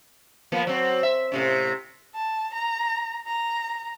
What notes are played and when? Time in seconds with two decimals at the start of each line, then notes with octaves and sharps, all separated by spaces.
0.52 F3 A#3 B3
0.67 F#3 C4
1.03 E5
1.32 A2 C3 C#4
2.15 A5
2.54 A#5
3.27 A#5